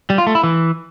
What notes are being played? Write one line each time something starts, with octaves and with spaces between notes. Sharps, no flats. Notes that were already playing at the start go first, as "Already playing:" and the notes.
G3
F4
A3
E4
E3